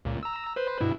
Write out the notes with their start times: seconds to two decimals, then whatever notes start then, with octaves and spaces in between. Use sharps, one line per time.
0.05 C#2 A#2
0.23 A#5 E6
0.56 B4 C5
0.81 G2 B2 E4